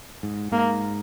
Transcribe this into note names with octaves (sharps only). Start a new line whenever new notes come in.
G#2
G#2 A#3